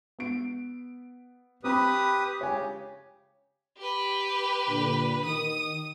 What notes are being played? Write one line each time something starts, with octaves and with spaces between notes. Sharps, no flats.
B3 D7
C4 G4 B4 B5 D#6
C#3 G4 C#5 G#5
G4 B4
A#2 D3 D4
D#3 D#6